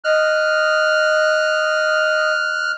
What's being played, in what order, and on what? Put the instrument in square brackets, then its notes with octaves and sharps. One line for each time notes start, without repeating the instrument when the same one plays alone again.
[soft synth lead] D#5 [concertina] F6 F#6